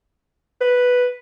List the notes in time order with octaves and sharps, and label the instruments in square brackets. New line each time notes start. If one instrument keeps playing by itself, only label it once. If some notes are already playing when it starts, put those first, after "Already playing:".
[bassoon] B4